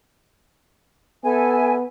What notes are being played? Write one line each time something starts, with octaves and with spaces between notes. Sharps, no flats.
B3 A4 E5 G#5